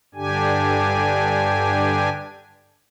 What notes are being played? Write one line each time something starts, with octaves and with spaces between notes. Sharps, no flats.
G2 D3 D4 G4 G#5